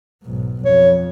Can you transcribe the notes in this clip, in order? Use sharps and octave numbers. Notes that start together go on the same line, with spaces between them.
B1 G#2
F2 C#5